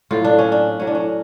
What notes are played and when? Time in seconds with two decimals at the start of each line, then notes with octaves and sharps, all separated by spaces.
0.11 A2 F#3 F4
0.24 D4
0.38 C#4
0.52 D4
0.79 A2 F#3 C#4
0.87 D4
0.95 C#4